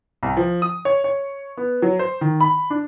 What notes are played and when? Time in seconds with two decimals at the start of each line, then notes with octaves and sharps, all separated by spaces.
0.23 C2
0.37 F3
0.62 D#6
0.85 C#5
1.04 C#5
1.57 B3
1.82 F#3
1.99 C5
2.21 D#3
2.41 B5
2.70 D4